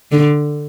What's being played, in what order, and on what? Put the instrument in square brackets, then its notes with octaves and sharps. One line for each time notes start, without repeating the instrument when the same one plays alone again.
[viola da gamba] D3